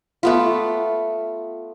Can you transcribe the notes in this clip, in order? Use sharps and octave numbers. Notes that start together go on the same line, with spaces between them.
A3 B3 F4